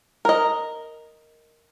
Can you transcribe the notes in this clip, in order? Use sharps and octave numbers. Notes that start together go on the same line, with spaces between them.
A#4 D#5